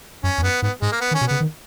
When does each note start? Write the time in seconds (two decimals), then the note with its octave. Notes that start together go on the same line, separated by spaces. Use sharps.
0.23 F#2 C#4
0.38 E2
0.43 F#2 B3
0.62 G#2 B3
0.82 G#2 G#3
0.92 A#3
1.01 B3
1.11 D#3
1.15 C#4
1.21 B2
1.28 C#3 B3
1.41 D#3